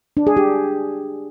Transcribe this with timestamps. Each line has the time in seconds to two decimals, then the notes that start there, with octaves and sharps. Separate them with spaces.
0.17 D4
0.27 G#4
0.37 G4